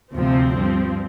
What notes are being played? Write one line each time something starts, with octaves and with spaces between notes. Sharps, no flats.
D2 C3 F3 C4
G2 F3